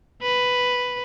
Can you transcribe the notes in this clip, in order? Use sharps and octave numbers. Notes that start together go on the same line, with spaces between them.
B4